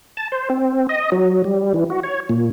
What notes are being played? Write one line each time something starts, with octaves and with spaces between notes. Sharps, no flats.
A5
C5
C4
D#5
F#3
G3
E3
F#4
C#5
A#2